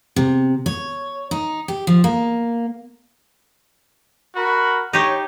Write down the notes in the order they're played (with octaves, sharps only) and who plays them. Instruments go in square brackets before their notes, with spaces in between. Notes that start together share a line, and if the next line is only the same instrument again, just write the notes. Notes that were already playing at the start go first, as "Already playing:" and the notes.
[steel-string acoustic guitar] C3
C#5
D#4
G4
F3
A#3
[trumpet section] F#4 A#4 B5
[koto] D#4 G4 [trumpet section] C#5